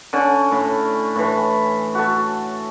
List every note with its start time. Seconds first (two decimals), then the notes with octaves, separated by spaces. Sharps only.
0.13 D3 C#4
0.51 A2
1.16 A2 E3
1.95 F#4 A4